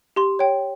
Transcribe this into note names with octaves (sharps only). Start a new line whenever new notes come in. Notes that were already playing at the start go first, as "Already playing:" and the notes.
G4 C6
C#5 G5